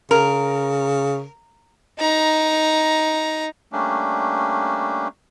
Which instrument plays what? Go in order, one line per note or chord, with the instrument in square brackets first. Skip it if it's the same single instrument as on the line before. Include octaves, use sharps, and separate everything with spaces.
[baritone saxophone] C#3 [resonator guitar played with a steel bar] A#4
[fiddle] D#4 A#5
[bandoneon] G3 A3 A#3 C#4 D4